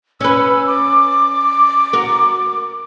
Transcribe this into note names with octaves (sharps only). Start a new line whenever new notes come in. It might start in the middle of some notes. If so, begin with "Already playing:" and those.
C#4 B4 E6
D6
F#4 A#4